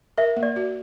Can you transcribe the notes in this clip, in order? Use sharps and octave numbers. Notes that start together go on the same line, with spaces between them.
A#4 E5
A#3
D5
F#4